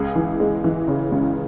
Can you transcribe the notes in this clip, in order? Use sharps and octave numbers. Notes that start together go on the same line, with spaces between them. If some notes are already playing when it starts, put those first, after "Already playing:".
Already playing: C#2 G#4
E3
G#3
E3
C#3
C#2